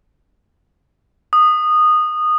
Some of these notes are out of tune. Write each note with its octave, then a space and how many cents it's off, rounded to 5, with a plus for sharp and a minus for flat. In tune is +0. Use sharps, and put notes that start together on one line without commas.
D#6 -15